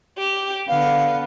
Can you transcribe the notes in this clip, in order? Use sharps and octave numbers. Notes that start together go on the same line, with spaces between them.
G4
D3 B3 F5